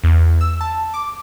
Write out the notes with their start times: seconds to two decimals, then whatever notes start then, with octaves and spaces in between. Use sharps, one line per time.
0.04 E2
0.41 E6
0.61 A5
0.94 D6